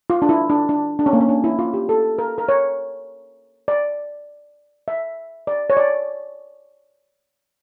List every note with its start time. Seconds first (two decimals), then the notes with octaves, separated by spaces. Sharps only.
0.10 F4
0.22 D4
0.29 E4
0.50 D4
0.69 D4
0.99 D4
1.06 C#4
1.13 A#3
1.20 C#4
1.29 D4
1.44 E4
1.59 F4
1.74 G4
1.89 A4
2.18 A#4
2.38 A#4
2.49 C#5
3.68 D5
4.88 E5
5.47 D5
5.70 C#5
5.77 D5